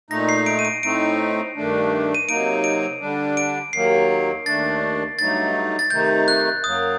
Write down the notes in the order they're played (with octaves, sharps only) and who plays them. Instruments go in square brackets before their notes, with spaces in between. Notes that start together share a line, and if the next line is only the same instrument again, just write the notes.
[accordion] A#2 A3 D#4 [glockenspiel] A#6
[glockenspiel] C7
D7
D#7
D7
[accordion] A2 A3 C4 D#4 [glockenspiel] D7
[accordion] G2 D#3 A3 D4
[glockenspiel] D#7
[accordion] C3 F#3 A#3 D#4 [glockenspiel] D7
[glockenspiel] D7
[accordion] D3 G3 D4
[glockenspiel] D7
[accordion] D#2 D#3 F#3 A#3 [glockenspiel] C7
[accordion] D#2 D#3 A3 D4 [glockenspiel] A6
[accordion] G2 F#3 A3 D#4 [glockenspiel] A6
[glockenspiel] A6
[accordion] C3 D#3 A3 D#4 [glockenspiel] G6
[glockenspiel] F#6
[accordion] F#2 F#3 A#3 [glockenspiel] D#6